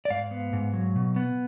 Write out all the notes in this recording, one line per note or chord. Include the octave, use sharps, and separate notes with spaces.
D5
G#2 F5
B3
G#2
F#3
B2
B3